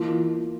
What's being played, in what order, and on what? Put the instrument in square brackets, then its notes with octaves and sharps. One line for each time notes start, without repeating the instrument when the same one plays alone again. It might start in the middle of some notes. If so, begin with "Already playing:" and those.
Already playing: [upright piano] E3 A#3 F4